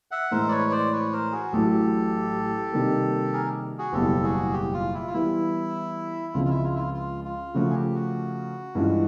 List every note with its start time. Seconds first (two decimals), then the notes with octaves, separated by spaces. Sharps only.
0.11 E5 F#5
0.31 A2 E3 G#3 A#4 C5
0.48 D5
0.51 B4 C#5
0.71 C5 D5
0.92 B4 C#5
1.12 A#4 C5
1.32 F#4 G#4
1.53 A1 A2 F#3 G4 A4
2.73 C3 D#3 G3 A#3
3.33 G#4 A#4
3.78 F#4 G#4
3.93 F#1 E2 B2 G3 G4 A4
4.23 F#4 G#4
4.53 G4
4.73 F4
4.94 E4
5.07 F4
5.13 E3 G3 B3 E4
6.34 C#2 C#3 F3 G#3 C4 F4
6.45 F4
6.49 E4
6.64 F4
6.75 E4
6.79 F4
6.94 F4
7.25 F4
7.54 C#3 F3 A3 C#4 F#4
7.70 G#4
7.74 G4
7.95 F#4
8.75 G2 E3 G#3 C#4 F4